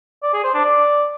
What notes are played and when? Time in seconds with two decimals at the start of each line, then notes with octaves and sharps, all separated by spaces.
0.23 D5
0.33 G#4
0.44 C5
0.54 D4
0.65 D5